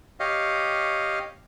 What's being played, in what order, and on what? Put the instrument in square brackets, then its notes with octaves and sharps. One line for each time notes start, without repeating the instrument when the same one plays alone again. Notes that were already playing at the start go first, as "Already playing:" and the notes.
[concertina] G4 C#5 D#5 F5